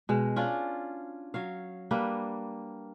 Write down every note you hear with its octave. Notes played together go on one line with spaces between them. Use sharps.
B2 G#3
C#4 D4 F4 D5
F#3 C#5 F5
G3 A#3 D4 B4